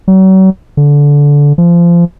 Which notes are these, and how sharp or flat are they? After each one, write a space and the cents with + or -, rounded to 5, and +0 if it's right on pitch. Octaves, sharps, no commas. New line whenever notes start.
F#3 +40
D3 -20
F3 -25